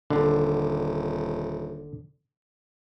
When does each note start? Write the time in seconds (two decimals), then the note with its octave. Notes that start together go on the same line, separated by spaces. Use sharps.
0.10 D#1 D3